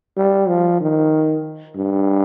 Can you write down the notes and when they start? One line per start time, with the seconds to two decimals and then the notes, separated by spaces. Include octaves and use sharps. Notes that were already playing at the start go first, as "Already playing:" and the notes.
0.17 G3
0.48 F3
0.81 D#3
1.76 G2